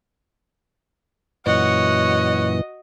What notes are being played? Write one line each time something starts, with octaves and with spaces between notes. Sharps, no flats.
F#2 A#2 E3 F#4 C#5 D#5 F#5